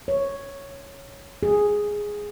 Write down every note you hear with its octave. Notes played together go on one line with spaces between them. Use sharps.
C#5
G#4